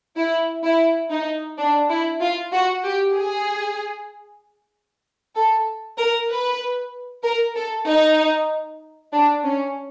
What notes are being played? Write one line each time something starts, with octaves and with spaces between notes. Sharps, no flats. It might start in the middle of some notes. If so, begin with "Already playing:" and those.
E4
E4
D#4
D4
E4
F4
F#4
G4
G#4
A4
A#4
B4
A#4
A4
D#4
D4
C#4